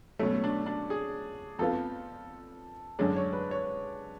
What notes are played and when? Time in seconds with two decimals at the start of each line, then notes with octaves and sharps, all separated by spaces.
0.19 B2 F#3 A3 C#4
0.44 D4
0.66 D4
0.90 G#4
1.59 F2 F3 B3 F4 A4
2.99 F#2 D3 G#3 C#4 D4
3.16 C#5
3.33 B4
3.51 C#5